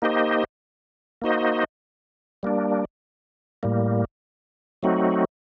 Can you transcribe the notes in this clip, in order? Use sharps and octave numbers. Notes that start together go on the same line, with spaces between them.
A#3 D#4 G4 C5 D#5
A#3 D#4 F#4 C5 D#5
G3 A#3 D4
A2 G3 A#3
F#3 A3 C4 D#4 F#4